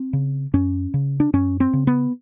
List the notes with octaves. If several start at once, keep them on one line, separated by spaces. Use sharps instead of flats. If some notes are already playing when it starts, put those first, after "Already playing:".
Already playing: C4
C#3
F#2 C#4
C#3
D4
F#2 C#4
C4
C#3
B3